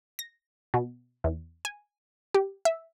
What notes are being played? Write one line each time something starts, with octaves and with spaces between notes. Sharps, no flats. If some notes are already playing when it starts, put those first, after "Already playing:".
A#6
B2
E2
G#5
G4
E5